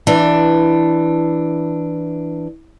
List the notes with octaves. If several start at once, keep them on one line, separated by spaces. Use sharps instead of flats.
E3 D4